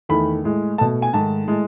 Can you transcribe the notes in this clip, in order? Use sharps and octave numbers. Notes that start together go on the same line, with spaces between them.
E2 D#3 A3 B5
A2 G#3
B2 A3 A5
G#5
G#2 D#3 A3 A5
A2 G#3